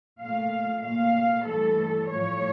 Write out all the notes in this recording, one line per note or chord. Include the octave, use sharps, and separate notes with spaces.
A#2 A3 F5
A#2 A3 F5
G2 E3 A3 A4
A2 F3 A3 C#5